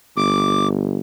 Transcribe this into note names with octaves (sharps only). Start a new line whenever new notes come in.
G1 D6